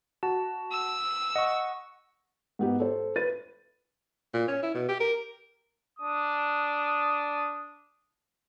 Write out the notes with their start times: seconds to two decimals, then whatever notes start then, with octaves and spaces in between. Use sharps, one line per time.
0.23 F#4 A5
0.72 E6
1.36 D#5 F#5 C#6
2.59 G#2 B3 G4
2.80 A4 C5
3.16 B4 A6 D#7
4.34 A#2
4.48 C#4
4.63 E4
4.74 B2
4.89 G4
5.00 A#4
5.99 D4 D#6